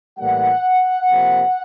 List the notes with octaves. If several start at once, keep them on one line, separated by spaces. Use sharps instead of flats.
A2 E3 G3 A#3 F#5
C3 F3 A#3